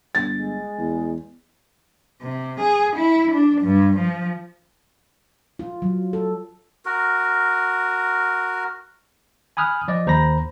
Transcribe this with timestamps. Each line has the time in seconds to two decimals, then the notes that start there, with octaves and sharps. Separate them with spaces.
0.15 G1 A6
0.33 G#3
0.78 E2
2.22 C3
2.60 G#4
2.96 E4
3.31 D4
3.61 G2
3.98 F3
5.59 F4
5.82 F#3
6.13 A4
6.86 F#4 A#4
9.57 G#5 B5 D#6 F6 F#6
9.88 F3 D5 D#5
10.06 D#2 C5 A#5 B5 A#6